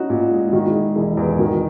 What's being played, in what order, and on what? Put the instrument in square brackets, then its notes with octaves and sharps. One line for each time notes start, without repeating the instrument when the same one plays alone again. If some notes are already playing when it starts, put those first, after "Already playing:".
Already playing: [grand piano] C#4 E4 [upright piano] D#4 F#4
[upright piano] A#2
G#3
[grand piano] E4
[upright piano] D#3 [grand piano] D#4 F#4
[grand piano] E4 G#4
[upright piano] G#3
[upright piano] E1 [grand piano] E4 G#4
[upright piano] E2
[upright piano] D#3 [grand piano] F#4 A#4